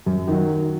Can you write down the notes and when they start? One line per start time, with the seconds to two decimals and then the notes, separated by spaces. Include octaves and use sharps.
0.06 F#2
0.28 D#3 F#3